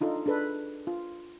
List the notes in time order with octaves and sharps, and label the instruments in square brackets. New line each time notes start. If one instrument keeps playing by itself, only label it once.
[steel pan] D4 D#4 F4 A4
D4 G#4 A4 B4
F4